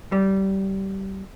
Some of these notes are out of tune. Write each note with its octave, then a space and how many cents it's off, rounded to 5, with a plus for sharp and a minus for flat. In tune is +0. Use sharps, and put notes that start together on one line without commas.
G3 -20